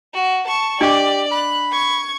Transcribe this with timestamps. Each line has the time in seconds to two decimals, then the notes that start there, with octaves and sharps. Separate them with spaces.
0.14 F#4
0.48 A5 C#6
0.81 D4 G4 D5 D#5 D6
1.32 B5 F#6
1.72 C#6 G#6